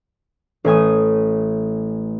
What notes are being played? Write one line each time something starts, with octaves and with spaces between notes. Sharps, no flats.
A1 A3 G#5 D#6